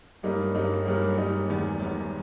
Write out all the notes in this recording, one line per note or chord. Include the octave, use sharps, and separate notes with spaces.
G1 G2 G3 A#3 D#4
G1 G2 G3 A#3 D#4
G1 G2 G3 A#3 D#4
G1 G2 G3 A#3 D#4
E1 E2 D#3 G3
E1 E2 D#3 G3